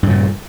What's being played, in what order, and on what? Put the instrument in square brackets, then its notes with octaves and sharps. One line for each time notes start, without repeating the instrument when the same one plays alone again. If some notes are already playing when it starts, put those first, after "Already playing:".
[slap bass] G2
C#3
A#2